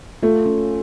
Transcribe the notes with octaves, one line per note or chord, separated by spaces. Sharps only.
A3 F4
C#4